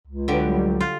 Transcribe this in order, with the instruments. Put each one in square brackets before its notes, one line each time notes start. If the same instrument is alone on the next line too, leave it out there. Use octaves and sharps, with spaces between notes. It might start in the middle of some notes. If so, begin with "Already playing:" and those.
[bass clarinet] C#2
[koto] D3 G4 [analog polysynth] F#3 B4
[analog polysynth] F#3 G3
[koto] F4